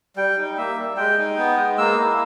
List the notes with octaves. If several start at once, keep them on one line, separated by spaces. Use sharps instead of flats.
G3 G5
D#4
A#3 E5
G3
G#3 G5
D#4
B3
G#3
A#3 E6
E4